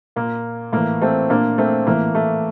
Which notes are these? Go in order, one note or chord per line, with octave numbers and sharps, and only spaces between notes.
A#2 A#3
A2 E3 A#3
A3 C4
A#2 A#3 D4
A3 C4
A2 E3 A#3
A3